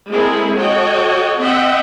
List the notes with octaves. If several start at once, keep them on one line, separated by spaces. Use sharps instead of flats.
G#3 A3 C4 E4 G#4 A#4
F#4 A4 C#5 D#5 G5
C4 D#5 E5 F#5 G5